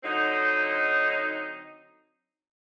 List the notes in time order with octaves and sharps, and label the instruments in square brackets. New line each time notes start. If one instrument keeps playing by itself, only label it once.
[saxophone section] D3 F#3 C4 D#4